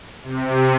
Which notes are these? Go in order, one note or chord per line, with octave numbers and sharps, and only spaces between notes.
C3